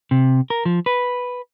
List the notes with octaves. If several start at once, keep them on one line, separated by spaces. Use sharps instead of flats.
C3
A#4
F3
B4